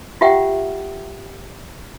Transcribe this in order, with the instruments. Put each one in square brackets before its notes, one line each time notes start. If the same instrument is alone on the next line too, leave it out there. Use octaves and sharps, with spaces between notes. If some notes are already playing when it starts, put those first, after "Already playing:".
[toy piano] F4 G4 E5 F#5 G5